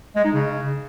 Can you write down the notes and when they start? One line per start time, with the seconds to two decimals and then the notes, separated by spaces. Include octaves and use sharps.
0.16 G#3
0.25 D#4
0.33 C#3